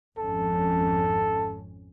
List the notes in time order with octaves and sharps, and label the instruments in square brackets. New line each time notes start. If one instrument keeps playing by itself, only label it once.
[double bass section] G#1 F2 C#4 [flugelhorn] A4